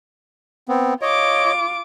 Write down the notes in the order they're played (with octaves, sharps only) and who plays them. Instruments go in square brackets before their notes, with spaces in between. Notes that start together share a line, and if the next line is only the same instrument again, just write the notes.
[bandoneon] B3 C4
[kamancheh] F4 D6 [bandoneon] C#5 D#5